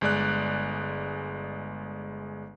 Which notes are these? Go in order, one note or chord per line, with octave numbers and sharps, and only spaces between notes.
G1 G#3 D5 F#6